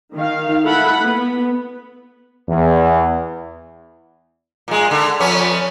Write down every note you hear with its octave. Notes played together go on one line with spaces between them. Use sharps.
D#3 F5
E4 A4 F#5 B5
B3
E2
A#2 G#3
D3
F2 B3 C#4